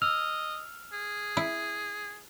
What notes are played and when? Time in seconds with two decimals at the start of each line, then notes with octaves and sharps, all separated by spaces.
0.02 D#5 E6 F6
0.92 G#4
1.37 E4